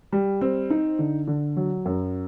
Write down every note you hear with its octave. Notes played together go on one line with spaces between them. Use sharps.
G3
C4
D#4
D3
D3
F#3
F#2